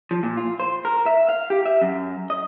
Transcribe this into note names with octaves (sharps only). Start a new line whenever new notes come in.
F3
A#2
F4
C5
A#4
E5
F5
G4
E5
F#2
D#5